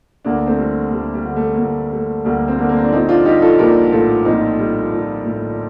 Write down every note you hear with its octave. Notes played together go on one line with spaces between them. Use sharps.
D2 A#3 D4
A3 C4
G3
D2 G3
G3
D3
A3
A#3
D2 A3
G3 A3
D2 G3 A#3
C4
D3 A#3 D4
A#3
C4
D4
A#1 C4 D#4
D4 F4
G3 D#4 G4
F4 A4
A#1 G4 A#4
A2 F4 A4
A#1 C4 D#4
G3
A#1
A2